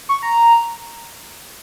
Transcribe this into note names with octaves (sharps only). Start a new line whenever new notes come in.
C#6
A#5